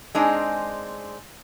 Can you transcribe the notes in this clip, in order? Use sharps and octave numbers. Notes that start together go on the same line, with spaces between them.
G#3 C4 D4 D#4 G#4